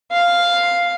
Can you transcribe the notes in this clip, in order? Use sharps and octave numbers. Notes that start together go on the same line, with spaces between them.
F5